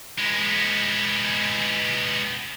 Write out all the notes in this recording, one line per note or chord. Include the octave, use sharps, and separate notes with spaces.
G#3 B3